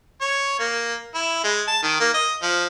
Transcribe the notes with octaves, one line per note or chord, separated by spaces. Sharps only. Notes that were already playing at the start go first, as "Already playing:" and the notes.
C#5
A#3
E4
G#3
A5
D#3
A#3
D#5
F3